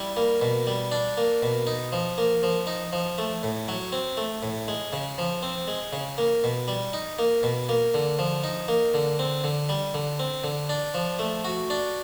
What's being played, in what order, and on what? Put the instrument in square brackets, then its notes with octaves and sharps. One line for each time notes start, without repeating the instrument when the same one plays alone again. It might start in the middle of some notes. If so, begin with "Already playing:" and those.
Already playing: [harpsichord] G3 E4
A#3
B2
G3
D4
A#3
B2
D#4
F3
A#3
F3
D#4
F3
A3
A2
F#3
C4
A3
A2
G#3
C#3
F3
C4
G#3
C#3
A#3
B2
G3
D#4
A#3
B2
A#3
D3
F3
D#4
A#3
D3
C4
D3
G3
D3
C4
D3
D4
F3
A3
F#4
D4